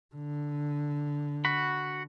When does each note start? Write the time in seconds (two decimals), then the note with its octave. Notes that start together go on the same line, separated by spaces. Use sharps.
0.15 D3
1.45 F#4 B5